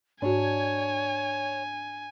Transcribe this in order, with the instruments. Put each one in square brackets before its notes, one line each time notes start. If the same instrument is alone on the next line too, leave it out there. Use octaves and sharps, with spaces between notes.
[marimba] G#2 F#4 [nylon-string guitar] D4 [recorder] C#5 [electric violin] G#5